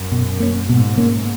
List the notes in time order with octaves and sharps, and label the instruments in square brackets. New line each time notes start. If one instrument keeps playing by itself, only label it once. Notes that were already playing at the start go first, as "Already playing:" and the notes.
Already playing: [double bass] F#2
[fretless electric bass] B2
A#3 C#4
[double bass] G#2 [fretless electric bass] B2
[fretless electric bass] A#3 C#4